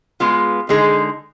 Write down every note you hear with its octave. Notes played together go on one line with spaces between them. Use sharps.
G#3 B3 F4
D3 G#3 D#4 G#4